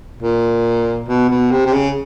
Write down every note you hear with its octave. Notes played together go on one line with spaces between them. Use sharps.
A#2
B2
B2
C3
C3
C#3